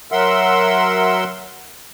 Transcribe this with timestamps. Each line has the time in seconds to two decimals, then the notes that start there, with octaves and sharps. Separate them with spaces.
0.12 F#3 A#4 E5 F#5 C6 E6